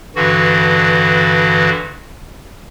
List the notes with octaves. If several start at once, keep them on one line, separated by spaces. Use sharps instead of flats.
G2 D3 E3 F#4